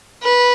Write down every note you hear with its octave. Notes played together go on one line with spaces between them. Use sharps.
B4